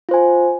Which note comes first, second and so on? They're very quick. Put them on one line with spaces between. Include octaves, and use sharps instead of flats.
F4 C5 G#5